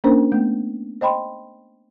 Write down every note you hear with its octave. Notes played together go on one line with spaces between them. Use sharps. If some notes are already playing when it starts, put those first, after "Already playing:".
A#3 C#4 D4 A#4 C5
A3 B3
C5 D#5 G5 B5 C6